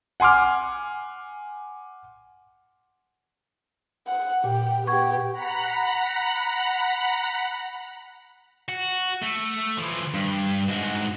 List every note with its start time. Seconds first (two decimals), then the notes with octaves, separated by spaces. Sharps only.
0.20 F#5 G#5 C6 D6 F6
4.07 F#5
4.44 A#2 G4
4.87 B3 G4 C#6 G#6
5.33 F#5 A#5 B5
8.69 F#4
9.23 A3
9.77 E3 F3
10.14 G2
10.69 G#2 F#4